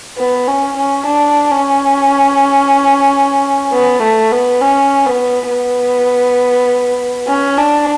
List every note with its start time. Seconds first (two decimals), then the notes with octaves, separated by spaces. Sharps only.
0.18 B3
0.48 C#4
0.77 C#4
1.06 D4
1.51 C#4
3.73 B3
4.03 A3
4.32 B3
4.61 C#4
5.06 B3
5.50 B3
7.28 C#4
7.58 D4